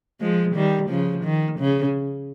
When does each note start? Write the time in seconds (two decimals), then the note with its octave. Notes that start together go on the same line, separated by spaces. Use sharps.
0.21 F3 G#3
0.55 D#3 G3
0.90 C#3 F3
1.24 D#3
1.59 C#3